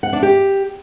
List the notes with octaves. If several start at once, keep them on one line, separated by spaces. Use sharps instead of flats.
F#5
D4
G4